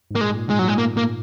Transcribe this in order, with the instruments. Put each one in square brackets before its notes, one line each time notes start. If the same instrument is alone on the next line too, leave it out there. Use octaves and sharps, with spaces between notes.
[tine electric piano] G#2 [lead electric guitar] A#3
[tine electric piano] A#2 [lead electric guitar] G#3
[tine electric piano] G#2
A#2
[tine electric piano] G#2 [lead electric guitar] G#3
[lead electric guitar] F#3
[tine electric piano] A#2 [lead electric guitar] G#3
[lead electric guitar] A#3
A#3